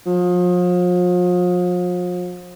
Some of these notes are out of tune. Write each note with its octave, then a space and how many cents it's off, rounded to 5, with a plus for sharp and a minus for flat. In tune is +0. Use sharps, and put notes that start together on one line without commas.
F3 +40